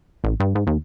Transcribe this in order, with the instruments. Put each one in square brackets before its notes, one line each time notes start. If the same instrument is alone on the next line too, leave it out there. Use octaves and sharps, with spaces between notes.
[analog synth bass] A1
G2
G#2
D#2